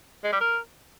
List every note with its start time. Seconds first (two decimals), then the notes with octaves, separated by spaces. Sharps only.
0.24 G#3
0.32 G3
0.41 A#4